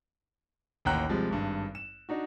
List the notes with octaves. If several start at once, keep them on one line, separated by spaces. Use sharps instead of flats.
A1 D#2 F#5 G5 A#5 F#6
C3 F3 G3 G#3
G#1 G2
E7
D4 D#4 F#4